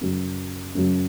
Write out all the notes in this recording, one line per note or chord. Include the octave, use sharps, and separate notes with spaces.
F#2 C#3 F#3
F#2 C#3 F#3